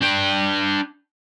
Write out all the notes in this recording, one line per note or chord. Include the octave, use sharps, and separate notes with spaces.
D4 G5